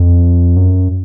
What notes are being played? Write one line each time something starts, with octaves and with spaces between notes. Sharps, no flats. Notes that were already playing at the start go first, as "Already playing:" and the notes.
Already playing: F2
F#2